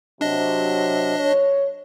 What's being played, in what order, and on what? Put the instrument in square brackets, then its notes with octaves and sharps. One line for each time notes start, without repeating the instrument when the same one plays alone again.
[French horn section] C3 F#3 [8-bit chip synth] D4 D#5
[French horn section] C#5